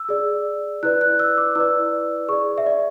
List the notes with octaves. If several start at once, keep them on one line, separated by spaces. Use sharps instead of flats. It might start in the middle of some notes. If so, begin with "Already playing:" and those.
Already playing: E6
G#4 D5
E4 B4 D5 F#6
F#6
E6
D6
E4 B4 D5 E6
G#4 D5 C#6
E5
D5